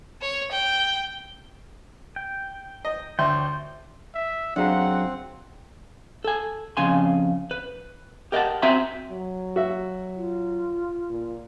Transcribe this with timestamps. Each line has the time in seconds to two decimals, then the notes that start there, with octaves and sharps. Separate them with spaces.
0.21 C#5
0.51 G5
2.16 G5
2.85 D#5
3.19 D2 C#5 D5 E5 G5 C6
4.15 E5
4.56 F#2 C4 D4 F4 G#4 F#5 A#5
6.24 A4 G#5
6.77 F2 C#3 G#5 C6
7.51 B4
8.32 G4 A#4 D#5 E5 F#5 A5
8.62 C4 F#4 E5 G#5 A#5 C6
9.10 F#3
9.56 F#4 E5
10.17 F4
11.10 A#2